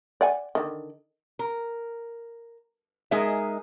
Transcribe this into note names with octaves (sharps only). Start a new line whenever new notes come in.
D5 F#5 G#5
D3 D#3
A#4
G#3 D#4 G#4 A#4 E5